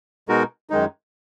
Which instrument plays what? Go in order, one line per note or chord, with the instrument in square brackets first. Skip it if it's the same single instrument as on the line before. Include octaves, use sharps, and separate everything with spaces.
[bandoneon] B2 G#3 D#4 F#4 A#4
F#2 D#3 G#3 D#4